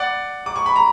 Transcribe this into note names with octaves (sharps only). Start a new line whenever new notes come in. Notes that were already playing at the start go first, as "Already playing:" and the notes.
Already playing: D5 F#5
D6
C#6
B5
A#5